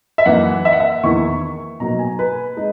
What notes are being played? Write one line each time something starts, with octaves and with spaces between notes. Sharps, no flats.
E5
F#2 E3 A#3 D#4 F#5
E5
F#5
E5
E2 D#3 A#3 E4 C#6
B2 F#3 A#3 D#4 A#5
G#5
B4
G#3 D#4